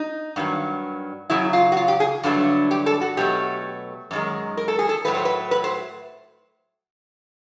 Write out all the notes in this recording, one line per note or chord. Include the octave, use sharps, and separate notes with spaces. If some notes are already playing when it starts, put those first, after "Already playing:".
Already playing: D#4
G2 D#3 F#3
F#2 C#3 F#3 E4
F4
F#4
F4
G4
G#4
G2 D3 F#3 A3
G4
A4
F#4
B2 F#3 A3 G4
F#2 D#3 G#3
A#4
A4
G#4
A4
A2 F#3 A3 B4
C5
B4
B4
C5